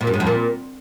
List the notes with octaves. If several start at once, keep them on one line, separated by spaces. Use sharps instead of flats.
A#2
F#2
G#2
F2
A#2